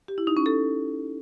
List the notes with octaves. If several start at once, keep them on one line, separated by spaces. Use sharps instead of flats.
G4
E4
D#4
C#4
A4